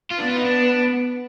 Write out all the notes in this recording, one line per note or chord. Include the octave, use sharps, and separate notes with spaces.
F4
B3 D4
F4
D#4
D4